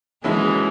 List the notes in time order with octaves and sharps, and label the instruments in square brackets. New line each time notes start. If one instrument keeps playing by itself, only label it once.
[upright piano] D#2 C#3 F#3 C#4 E4 [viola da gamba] E3 G#3